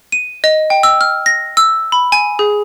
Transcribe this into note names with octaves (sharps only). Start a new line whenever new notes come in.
D#7
D#5
G5
E6
F6
A#6
E6
B5
G#5
G#4